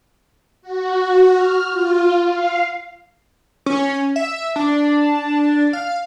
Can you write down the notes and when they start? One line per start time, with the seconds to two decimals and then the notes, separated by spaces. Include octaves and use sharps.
0.62 F#4
1.35 F6
1.71 F4
2.30 F5
3.66 C#4
4.16 E5
4.56 D4
5.73 F5